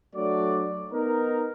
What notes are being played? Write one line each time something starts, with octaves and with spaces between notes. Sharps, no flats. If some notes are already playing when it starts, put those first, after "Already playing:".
F#3 A3 D4 F#4 D5
B3 D#4 A#4